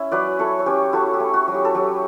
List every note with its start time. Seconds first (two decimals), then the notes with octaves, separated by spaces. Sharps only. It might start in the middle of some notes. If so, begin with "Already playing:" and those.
Already playing: C#4 E4 E5
0.11 F#3 B4 D5
0.39 E4 A4 C#5
0.59 C#5
0.66 C#4 G4 B4
0.93 E4 F#4 A4
1.14 G4
1.20 A3
1.34 F#4
1.48 F#3
1.54 G4
1.65 A4
1.75 F#3 G4